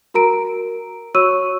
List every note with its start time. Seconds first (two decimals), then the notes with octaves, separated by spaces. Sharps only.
0.14 F#4 A#4 A#5 D7
1.14 F#4 C#5 C#6 E6 D#7